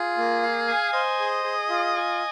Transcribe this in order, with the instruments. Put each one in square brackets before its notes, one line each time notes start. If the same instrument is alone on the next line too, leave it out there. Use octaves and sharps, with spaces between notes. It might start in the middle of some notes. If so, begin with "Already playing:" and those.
Already playing: [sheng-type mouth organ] F4 [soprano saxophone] G#4
[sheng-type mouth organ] A#3
F5
G#5
[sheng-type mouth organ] C5 [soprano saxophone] D#5
[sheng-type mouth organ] G#4
G#4
F4
G#5